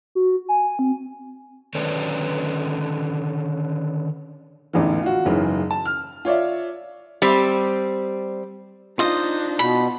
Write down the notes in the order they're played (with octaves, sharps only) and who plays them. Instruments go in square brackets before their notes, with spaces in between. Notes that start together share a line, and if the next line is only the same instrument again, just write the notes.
[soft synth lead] F#4
G#5
C4
[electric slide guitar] D3 D#3 C#4 A4 B4 D5
[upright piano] A1 E2 G#2 D3 E3
F4 F#4
F#1 G#2 C#3 E3
A5
F6
F4 C#5 D5 E5
[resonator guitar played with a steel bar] G3 C4
[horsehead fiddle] D4 D#4 [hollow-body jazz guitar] F4 [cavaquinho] C5 D#5
[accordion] B2 [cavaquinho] B5